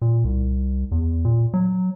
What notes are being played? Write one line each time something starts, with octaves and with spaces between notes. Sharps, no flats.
A#2
C2
E2
A#2
F#3